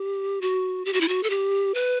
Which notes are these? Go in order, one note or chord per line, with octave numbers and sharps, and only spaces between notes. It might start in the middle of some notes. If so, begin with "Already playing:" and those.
Already playing: G4
F#4
G4
F#4
E4
F#4
A4
G4
B4